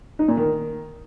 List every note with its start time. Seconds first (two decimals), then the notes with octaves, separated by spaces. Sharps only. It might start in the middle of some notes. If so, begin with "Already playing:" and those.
0.19 D#4
0.28 A#2
0.37 D#3